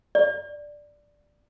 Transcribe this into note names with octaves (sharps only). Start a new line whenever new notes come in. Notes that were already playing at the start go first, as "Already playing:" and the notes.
D5